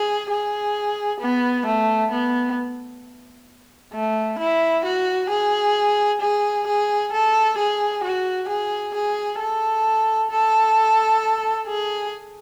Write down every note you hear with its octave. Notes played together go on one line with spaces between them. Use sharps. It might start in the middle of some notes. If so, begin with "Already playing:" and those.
Already playing: G#4
G#4
B3
A3
B3
A3
E4
F#4
G#4
G#4
G#4
A4
G#4
F#4
G#4
G#4
A4
A4
G#4